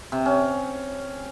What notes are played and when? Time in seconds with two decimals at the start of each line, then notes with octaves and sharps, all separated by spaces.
0.12 C3
0.26 C#4